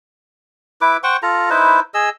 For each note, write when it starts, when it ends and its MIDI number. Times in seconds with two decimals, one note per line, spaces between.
0.81 0.97 64
0.81 0.97 71
0.81 0.97 86
1.03 1.17 72
1.03 1.17 78
1.03 1.17 79
1.03 1.17 85
1.23 1.50 65
1.23 1.50 69
1.23 1.50 82
1.50 1.80 63
1.50 1.80 64
1.50 1.80 71
1.50 1.80 72
1.94 2.09 68
1.94 2.09 75
1.94 2.09 88